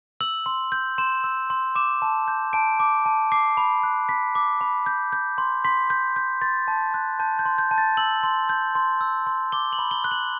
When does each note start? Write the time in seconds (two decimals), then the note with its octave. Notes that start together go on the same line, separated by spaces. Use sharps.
0.21 E6 F#7
0.46 C6
0.72 G6
0.98 C6 E7
1.24 E6
1.50 C6
1.75 D6 E7
2.02 A5
2.28 G6
2.53 A5 D7
2.80 D6
3.06 A5
3.32 D6 C7
3.57 B5
3.83 F#6
4.09 B5 B6
4.35 D6
4.61 B5
4.86 G6
5.12 G6
5.38 C6
5.65 C6 B6
5.90 G6
6.16 G6
6.41 C6 A6
6.68 A5
6.94 F#6
7.20 A5 G6
7.39 G6
7.45 C6
7.58 G6
7.71 A5
7.78 A6
7.97 E6 F#7
8.23 C6
8.49 G6
8.75 C6
9.01 E6
9.27 C6
9.52 D6 G7
9.73 F#7
9.79 B5
9.91 G7
10.04 F#6
10.11 F#7